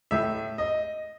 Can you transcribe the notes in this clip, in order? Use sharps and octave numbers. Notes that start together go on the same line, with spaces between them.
A2 E5
D#5